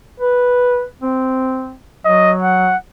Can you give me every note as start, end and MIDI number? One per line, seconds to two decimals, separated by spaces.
0.20 0.83 71
1.02 1.74 60
2.05 2.73 54
2.05 2.33 75
2.42 2.77 78